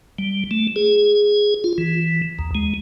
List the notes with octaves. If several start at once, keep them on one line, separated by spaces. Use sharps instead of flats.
G3
A3
G#4
F4
E3
D#2
G#3